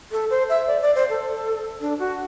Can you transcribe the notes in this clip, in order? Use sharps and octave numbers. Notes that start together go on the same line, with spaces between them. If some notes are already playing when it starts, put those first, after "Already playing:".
A4
C5
E5
D5
D5
C5
A4
D4
F#4